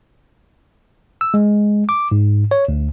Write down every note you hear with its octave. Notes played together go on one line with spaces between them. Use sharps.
E6
G#3
D6
G#2
C#5
D2